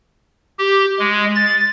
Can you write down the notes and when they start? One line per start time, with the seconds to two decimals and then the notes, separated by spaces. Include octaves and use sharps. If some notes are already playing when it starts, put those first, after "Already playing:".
0.59 G4
0.99 G#3
1.36 A6